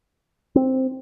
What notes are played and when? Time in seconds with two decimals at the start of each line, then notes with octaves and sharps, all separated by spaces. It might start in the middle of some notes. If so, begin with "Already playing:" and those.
0.56 C4